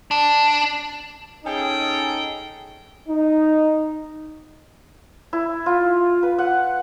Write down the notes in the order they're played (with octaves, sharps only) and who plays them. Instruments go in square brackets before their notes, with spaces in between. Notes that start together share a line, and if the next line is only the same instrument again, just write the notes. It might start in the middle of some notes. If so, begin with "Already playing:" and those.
[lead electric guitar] D4
[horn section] C#4 D#4 G#4 A4 G5
[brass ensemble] D#4
[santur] E4
F4
B4
F#5